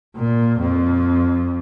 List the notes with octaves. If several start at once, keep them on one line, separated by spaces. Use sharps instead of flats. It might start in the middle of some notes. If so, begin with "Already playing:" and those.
A#2
F2